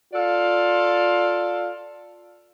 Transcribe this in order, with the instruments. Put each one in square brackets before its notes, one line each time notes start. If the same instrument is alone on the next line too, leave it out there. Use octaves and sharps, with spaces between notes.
[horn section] F4 A4 D5 F5